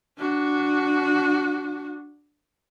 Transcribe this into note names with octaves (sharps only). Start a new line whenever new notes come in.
D4 F#4